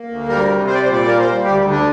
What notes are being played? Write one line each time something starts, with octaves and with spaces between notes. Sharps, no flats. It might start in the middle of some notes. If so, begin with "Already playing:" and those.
Already playing: A#3
D2
G3 A#4
C3
G3 C5
D5
C5
A#2
D5
A#3 A#4
C5
G3
D2 G4
D3
D4